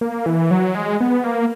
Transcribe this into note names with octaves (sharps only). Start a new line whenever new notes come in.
A#3
E3
F#3
G#3
B3
A#3